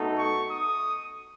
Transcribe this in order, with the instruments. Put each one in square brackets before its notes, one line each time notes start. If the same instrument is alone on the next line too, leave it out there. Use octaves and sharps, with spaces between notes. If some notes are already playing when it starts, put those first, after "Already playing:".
Already playing: [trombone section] B2 A3 D#4 A4
[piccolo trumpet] C#6
D#6